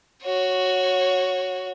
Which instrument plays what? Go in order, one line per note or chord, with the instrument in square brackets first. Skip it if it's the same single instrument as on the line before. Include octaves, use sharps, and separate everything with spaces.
[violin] F#4 C#5